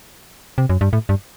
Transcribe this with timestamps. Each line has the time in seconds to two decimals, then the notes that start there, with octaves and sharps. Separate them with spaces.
0.58 C3
0.69 F#2
0.81 G2
0.93 A2
1.09 G2